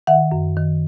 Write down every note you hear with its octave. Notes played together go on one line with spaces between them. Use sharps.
D#3 E5 F#5
F#2
D#3